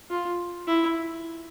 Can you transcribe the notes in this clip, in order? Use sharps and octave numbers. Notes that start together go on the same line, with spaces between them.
F4
E4